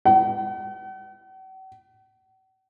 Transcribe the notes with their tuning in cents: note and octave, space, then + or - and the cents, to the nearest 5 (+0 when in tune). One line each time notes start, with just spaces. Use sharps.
F#5 +45